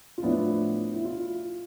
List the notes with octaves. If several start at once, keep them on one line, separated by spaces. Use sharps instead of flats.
F4
A2 F3 B3 D4 E4
E4
F4